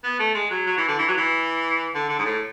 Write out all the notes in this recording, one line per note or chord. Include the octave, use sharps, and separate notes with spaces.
B3
A3
G#3
F#3
F#3
E3
D3
E3
F#3
E3
D3
D3
G#2
A2